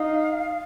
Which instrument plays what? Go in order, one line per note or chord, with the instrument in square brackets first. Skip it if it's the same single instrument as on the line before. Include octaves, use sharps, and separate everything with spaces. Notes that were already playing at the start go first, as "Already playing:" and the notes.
Already playing: [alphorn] D#4 [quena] F5